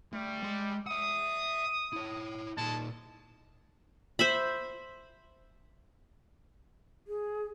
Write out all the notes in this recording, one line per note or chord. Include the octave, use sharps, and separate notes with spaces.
D3 G3 A3
G#3 C6
E5 F#5 D#6
E4 C#5
A#2 G#3 D#4 A5
C5 E5 B5
G#4